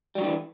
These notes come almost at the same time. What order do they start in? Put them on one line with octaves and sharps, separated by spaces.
G3 F#3 D3 E3